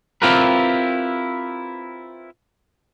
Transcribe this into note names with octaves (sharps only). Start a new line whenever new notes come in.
C4 E4 F4 G4 A#4 B4